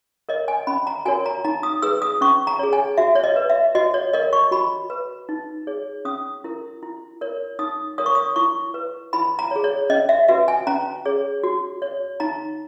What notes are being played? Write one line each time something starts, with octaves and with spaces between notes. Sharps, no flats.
A#4 C#5 D#5
G#5
C#4 B5
A#5
F#4 A#4 C#5 G#5
A#5
D#4 A#5
D#6
G#4 B4 E6
D#6
C#4 C#6
A#5
G#4 C#5
G#5
F#4 E5
C#5
D#5
B4
E5
F#4 D#5
C#5
A#4 C#5 D#5
C#6
F#4 B5
B4
D#4
G#4 C#5
C#4 D#6
E4 A#4
E4
A#4 C#5
D#4 D#6
A#4 C#5 D#6
C#6
D#6
E4 C#6
B4
E4 B5
A#5
C#5
G#4
C#5
C#4 D#5
E5
F#4 B4 E5
G#5
C#4 A#5
G#4 C#5
F#4
C#5
D#4 A#5